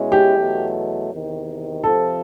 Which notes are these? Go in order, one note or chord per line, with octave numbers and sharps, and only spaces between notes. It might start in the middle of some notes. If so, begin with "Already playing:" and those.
Already playing: B2 G#3 C#4 E4
G4
E2 B2 F#3 A3
E2 C3 D#3
F2 C3 F3 A4